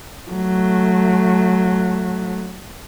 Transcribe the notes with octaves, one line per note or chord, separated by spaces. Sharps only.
F#3 A3